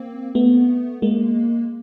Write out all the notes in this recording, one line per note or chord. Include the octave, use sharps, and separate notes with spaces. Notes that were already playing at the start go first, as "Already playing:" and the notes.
Already playing: A#3 C4
A3 B3
G#3 A#3